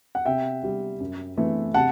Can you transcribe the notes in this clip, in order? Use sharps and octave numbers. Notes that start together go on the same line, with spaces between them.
F#5
C3 E5 G5
G3 C4
F#2
E3 A3 C4
C3 F#5 A5